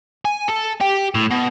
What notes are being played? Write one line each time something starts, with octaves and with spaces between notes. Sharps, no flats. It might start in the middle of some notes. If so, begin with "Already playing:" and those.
G#5
A4
G4
A2
B2